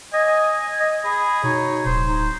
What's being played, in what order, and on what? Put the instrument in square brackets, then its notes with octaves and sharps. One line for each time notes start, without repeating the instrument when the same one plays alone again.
[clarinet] D#5 [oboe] G#5
[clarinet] D#5
[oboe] G#4 [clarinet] B5
[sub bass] B2 [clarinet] D#4 [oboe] C#5
[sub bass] D1 [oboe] C5
[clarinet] D#4